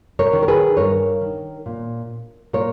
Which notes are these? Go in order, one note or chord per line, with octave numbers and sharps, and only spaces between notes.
A#4 C#5
D#3
A#4
G#4 B4
G2 A#4 C#5
D#3
A#2
A#2 A#4 C#5